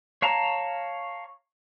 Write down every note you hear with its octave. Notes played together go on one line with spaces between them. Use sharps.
C#5 F5 A5 A#5